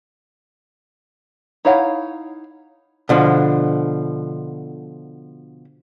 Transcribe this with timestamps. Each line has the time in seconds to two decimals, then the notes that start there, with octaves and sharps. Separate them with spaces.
1.65 D#4 E4 C#5 F5 F#5
3.09 B2 D3 F3